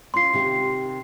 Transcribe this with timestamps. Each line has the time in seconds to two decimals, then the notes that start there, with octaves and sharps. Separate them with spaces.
0.14 C#4 F4 C6 C7
0.33 C3 D#3 G4